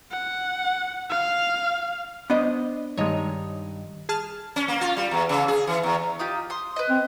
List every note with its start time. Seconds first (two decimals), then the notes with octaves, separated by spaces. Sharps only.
0.11 F#5
1.10 F5
2.30 B3 D4 C5 D#5
2.97 G2 D#3 G#3 D#4 C#5
4.09 G#4 A5 F6
4.56 C#4
4.68 A#3
4.81 F4
4.97 G3
5.11 E2
5.29 C#3
5.48 G#4
5.67 E3
5.83 E2
6.19 D#4 F4 G4
6.50 C6 D#6
6.76 B4 D#5
6.89 C4